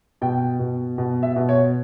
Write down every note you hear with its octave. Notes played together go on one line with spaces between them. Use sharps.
B2 G5
B2
B2
E5
B2
C#5